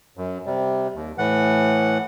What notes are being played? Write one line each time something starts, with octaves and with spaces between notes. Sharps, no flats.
F#2
C3 G3
D#2
A2 E3 F#5